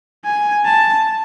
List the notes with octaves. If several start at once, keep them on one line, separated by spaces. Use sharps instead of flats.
G#5
A5